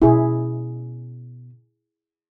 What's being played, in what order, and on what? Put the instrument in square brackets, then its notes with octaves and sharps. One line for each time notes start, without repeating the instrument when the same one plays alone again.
[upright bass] B2 C#4 [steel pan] E4 G#4